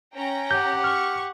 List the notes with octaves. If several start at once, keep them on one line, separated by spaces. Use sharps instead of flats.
C#4 G5 A#5
G4 F#5 G6
C#6 F6